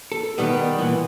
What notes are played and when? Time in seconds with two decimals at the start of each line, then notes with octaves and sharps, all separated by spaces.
0.12 A4
0.38 B2 D#3 G3 B3
0.78 A#2 E3 B3